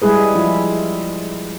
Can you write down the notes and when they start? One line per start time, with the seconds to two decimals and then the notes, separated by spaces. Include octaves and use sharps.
0.02 G3 G#3 E4 G#4 B4
0.35 F3 E4 F4